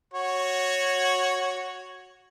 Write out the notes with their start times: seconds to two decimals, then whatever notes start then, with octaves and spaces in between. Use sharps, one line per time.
0.14 F#4 C#5